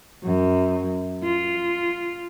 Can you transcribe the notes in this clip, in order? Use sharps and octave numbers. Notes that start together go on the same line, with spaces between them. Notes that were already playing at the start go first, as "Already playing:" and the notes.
F#2
F4